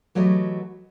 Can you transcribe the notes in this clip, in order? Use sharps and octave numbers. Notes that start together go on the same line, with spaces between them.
E3 F#3 A3 G4 D#5